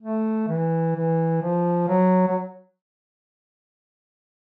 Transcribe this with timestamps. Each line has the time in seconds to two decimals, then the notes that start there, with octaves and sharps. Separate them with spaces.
0.02 A3
0.48 E3
0.95 E3
1.42 F3
1.88 F#3
2.27 F#3